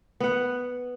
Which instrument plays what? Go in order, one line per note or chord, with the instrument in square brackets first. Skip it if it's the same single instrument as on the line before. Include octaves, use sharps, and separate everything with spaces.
[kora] B3 F#5